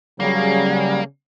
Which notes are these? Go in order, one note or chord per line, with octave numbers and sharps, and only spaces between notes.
C#3 F#3 G3 A#3